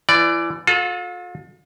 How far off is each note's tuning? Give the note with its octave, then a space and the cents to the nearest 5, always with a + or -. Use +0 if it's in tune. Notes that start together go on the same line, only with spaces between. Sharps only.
E3 +25 D5 +0
F4 +40 A4 -20